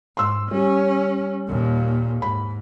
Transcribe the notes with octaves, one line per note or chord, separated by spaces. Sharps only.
G#2 C6 E6
G3 C#4
D#2 A#2
G#2 B5